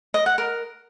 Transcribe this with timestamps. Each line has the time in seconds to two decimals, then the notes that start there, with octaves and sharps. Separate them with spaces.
0.14 D#5
0.26 F#5
0.38 A#4